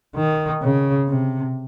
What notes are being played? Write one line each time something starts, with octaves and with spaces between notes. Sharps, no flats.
D#3
C#3
C3